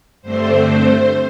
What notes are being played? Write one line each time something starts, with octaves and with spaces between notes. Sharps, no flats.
G2 D3 A3 C4 C5